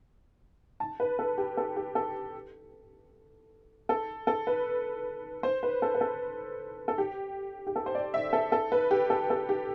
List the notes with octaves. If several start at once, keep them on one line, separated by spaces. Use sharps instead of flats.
A5
B4
A4
G4
A4
G4
A4
A4
A4
B4
C5
B4
A4
B4
A4
A4
G4
G4
A4
C5
D5
E5
A4
A4
B4
G4
A4
A4
G4